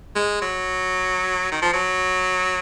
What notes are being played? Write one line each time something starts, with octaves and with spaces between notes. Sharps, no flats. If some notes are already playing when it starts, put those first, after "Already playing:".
G#3
F#3
D#3
F3
F#3